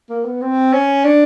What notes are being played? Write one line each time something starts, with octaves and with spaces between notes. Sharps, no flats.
A#3
B3
C4
C#4
D4